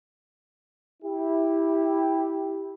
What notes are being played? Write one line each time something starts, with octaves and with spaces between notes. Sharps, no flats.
E4 G4